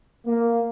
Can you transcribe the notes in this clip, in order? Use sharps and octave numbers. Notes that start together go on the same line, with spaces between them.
A#3